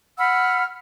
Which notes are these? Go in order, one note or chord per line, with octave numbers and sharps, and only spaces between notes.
F#5 B5 E6 F6